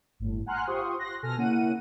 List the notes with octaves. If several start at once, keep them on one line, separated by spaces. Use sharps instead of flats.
G1 A2
F#5 G#5 A#5 C6 F6 F#6
F4 G4 C5 C6 C#6 D#6
C6 F#6 A#6
B2 A4 G#5 F6 A#6
C#3 A#3 C#4 E4 F#5 D#7